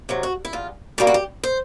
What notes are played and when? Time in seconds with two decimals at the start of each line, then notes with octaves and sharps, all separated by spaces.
0.09 C3 D#3 F#3
0.23 F#4
0.45 E4
0.53 E2 F4
0.98 B2 G3 A#3 G4
1.07 F#4
1.14 G4
1.43 C5